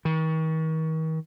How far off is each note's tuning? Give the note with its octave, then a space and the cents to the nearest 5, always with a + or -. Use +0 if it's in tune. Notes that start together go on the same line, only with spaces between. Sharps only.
D#3 +40